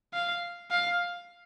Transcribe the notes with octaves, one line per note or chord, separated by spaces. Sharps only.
F5
F5